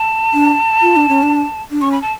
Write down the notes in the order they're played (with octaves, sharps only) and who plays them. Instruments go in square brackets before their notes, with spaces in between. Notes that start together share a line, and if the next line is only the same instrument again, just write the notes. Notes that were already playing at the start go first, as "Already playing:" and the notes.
Already playing: [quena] A5
[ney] D4
F4
D4
C#4
D4
D4
[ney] C#4 [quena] C#6
[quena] B5
A5